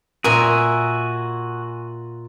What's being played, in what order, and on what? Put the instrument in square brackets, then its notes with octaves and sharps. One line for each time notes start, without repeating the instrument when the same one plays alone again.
[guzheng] A#2 [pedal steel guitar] F#4 G#5 D#6 [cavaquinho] A#4 E5